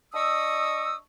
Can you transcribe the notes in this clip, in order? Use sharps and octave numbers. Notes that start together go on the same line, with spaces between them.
D4 D#5 C#6 D#6 E6